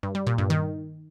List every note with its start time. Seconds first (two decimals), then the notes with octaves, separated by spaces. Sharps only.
0.03 G2
0.15 G3
0.27 A#2
0.38 G2
0.50 D#3